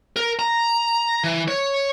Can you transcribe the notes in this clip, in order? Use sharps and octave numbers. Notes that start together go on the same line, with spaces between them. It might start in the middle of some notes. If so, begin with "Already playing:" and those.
A#4
A#5
E3
C#5